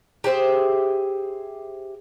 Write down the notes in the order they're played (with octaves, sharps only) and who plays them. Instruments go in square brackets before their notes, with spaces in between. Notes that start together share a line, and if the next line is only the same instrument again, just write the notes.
[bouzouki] G4 G#4 C5 E5